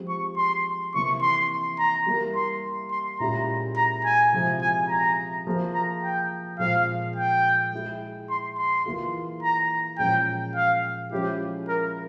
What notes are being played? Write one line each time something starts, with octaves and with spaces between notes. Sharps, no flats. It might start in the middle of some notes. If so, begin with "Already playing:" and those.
Already playing: F3 G#3 C4 G4
C#6
C6
C3 E3 A#3 E4 C#6
C6
A#5
G3 A#3 E4 G4 A#4
C6
C6
A#2 G#3 C#4 E4 G4 A#5
A#5
G#5
C3 F3 G#3 E4
G#5
A#5
F3 A#3 F4 G#4
A#5
G5
A#2 F3 G#3 C4 F5
G5
G#3 E4 G#4
C6
C6
E3 A#3 F4 G#4
A#5
A#2 F3 G#3 C#4 G5
F5
F3 G#3 C#4 E4 G4
A#4